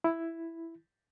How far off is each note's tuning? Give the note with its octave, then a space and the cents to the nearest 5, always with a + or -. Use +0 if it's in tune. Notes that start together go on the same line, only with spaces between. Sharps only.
E4 +5